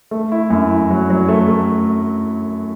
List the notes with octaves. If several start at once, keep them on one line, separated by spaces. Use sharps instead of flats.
A3
E4
F#2
E4
F#3
F#3
A3
A3